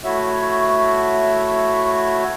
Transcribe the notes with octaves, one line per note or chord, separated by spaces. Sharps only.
A3 E4 F#4 C#5 E5